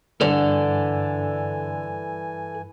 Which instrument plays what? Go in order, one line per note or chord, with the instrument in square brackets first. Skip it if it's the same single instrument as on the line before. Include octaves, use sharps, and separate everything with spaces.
[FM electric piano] G2 [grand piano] D3 [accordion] E3 G#5 [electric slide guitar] A4 D5